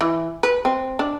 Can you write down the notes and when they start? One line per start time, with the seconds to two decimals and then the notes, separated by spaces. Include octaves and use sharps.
0.01 E3
0.43 B4
0.65 C4
0.99 D4